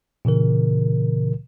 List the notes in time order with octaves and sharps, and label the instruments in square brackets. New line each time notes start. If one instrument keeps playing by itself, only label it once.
[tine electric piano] A#2 C#3 E3 A#4